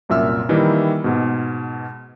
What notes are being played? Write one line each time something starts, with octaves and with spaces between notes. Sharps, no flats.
C2 F#2 A#2 E5 E6 F6
D#3 E3 G3 A#3 D#4 E4
G#2 B2